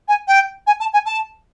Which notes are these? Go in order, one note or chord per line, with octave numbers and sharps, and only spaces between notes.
G#5
G5
G#5
A5
G#5
A5